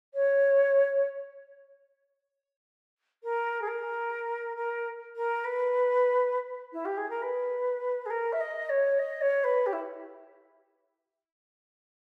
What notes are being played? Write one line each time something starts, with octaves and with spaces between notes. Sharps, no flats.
C#5
A#4
G#4
A#4
A#4
A#4
B4
E4
G4
G#4
A#4
B4
G#4
A#4
E5
D#5
C#5
D#5
C#5
B4
G4
E4